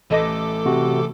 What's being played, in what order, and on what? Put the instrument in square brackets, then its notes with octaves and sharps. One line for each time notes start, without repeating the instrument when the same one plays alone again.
[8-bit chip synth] A1 A4 D6 [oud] E3 A3 D#5
[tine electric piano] C3 F#4